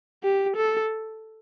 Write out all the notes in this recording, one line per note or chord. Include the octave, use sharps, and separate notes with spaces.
G4
A4